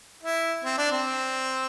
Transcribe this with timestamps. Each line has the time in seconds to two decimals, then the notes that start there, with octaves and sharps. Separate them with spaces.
0.23 E4
0.64 C4
0.78 D4
0.91 C4